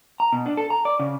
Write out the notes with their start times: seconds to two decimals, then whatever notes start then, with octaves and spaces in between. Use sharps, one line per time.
0.20 A#5
0.33 B2
0.46 D4
0.57 A4
0.70 A#5
0.85 D5
1.00 C#3